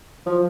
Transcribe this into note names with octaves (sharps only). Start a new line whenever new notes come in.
F3